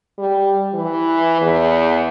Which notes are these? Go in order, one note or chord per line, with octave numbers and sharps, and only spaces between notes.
G3
E3
E2